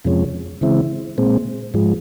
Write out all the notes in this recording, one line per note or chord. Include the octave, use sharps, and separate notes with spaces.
F2 C3 F3 G#3 C#4
C#3 E3 G#3 C4 E4
A#2 G#3 C4
G#2 F3 G#3